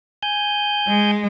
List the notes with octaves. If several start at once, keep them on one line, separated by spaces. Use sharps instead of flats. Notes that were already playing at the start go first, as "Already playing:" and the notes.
G#5 G6
G#3